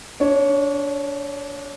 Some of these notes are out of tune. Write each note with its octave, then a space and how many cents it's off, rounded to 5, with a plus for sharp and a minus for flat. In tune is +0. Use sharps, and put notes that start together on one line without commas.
D4 -25 C#5 +0